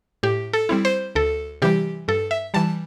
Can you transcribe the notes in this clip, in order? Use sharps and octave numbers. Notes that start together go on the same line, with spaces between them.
A2 G4
A4
G3 C4 E4
C5
D2 A4
C3 E3 G3 G4
G2 A4
E5
E3 G3 A5